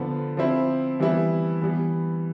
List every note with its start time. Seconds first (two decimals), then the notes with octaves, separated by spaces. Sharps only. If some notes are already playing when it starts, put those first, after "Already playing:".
Already playing: D3 F3 B3
0.37 F3 C4 E4
1.00 E3 G3 B3 E4
1.62 E3 G3 B3